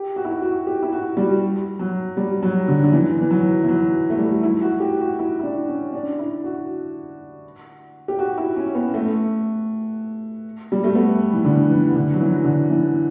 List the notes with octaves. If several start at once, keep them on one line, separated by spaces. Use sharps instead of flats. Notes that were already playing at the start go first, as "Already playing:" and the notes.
Already playing: G4
F#4
E4
F#4
F#4
G4
E4
F#4
G3
F#3
G3
F#3
D3
D3
E3
E3
F#3
E3
F#3
A3
G3
E4
F#4
G4
F#4
E4
E4
D4
C#4
D4
E4
F#4
G4
F#4
E4
C#4
B3
A3
G3
A3
B3
E3
D3
E3
D3
F#3
E3
D3
E3